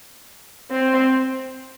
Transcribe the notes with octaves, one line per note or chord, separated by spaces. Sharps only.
C4